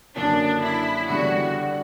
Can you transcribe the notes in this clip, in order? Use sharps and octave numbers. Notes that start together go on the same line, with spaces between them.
F#2 D3 A#3 D4
E4
E2 D3 G3 F#4